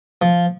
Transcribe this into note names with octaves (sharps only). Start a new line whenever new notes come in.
F3